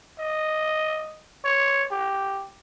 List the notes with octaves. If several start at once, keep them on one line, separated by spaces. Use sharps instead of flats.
D#5
C#5
G4